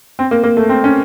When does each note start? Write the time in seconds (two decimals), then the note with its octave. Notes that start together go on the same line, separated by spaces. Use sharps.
0.19 C4
0.31 A#3
0.44 A#3
0.57 A3
0.69 C4
0.84 C#4